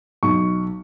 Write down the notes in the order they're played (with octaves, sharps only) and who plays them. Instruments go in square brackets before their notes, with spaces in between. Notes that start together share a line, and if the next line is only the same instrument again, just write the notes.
[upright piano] B1 [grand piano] C#6